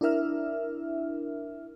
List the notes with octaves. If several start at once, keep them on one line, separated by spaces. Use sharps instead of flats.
D4 E4 A#4 E5 F6